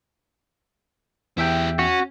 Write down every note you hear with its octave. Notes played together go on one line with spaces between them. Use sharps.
E2 E4 G4 E5 G5
C#4 F#4